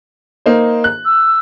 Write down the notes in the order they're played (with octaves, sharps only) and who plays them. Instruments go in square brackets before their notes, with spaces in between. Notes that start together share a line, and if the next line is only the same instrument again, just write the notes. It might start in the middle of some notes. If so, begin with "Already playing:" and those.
[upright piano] A#3 D#4 C5
F#6
[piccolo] E6